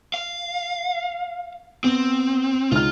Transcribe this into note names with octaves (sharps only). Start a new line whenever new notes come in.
F5
B3 C4
C#2 D#4 F4 F5 F6